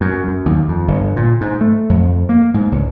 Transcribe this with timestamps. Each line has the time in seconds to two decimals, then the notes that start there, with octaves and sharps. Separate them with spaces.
0.01 F#2
0.28 F#2
0.46 D#2
0.68 F2
0.88 G1
1.16 A#2
1.41 G#2
1.61 A3
1.90 F2
2.29 A#3
2.54 G#2
2.72 C#2